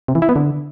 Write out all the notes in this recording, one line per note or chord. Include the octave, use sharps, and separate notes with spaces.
C3
E3
E4
B3
D3